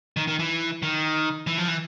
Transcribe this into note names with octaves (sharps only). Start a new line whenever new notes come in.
D#3
D#3
E3
D#3
E3
F3
E3